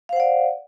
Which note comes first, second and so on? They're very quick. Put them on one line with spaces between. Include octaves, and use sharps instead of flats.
F5 C5 F#5 D5